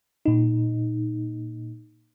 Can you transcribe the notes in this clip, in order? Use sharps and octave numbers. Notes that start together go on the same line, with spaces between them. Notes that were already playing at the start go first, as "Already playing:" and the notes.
A#2 D#4